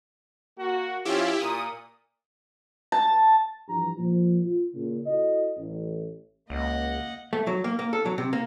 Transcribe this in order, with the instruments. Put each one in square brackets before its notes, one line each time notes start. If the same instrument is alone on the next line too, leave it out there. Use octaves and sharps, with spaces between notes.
[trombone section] A#3 F#4
[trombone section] F3 C#4 F4 [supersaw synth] E4 G4
[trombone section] A#2 [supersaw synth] D#6
[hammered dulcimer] A5
[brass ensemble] G2 E3 F3 D4 G4 A#5
A#2 F3
F4
A#2 C#3
E4 F#4 A4 D#5
A1
[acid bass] C#2 [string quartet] A#3 D#5 F#5
[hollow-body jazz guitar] A3
F#3
A#3
A#3
A4
F#3
C3
A#3